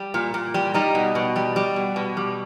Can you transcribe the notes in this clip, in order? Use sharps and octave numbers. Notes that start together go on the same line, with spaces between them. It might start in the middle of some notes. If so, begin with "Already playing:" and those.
Already playing: G3
A#2
A#2
G3
G3 D#4
B2
B2
G3
G3
B2
B2
G3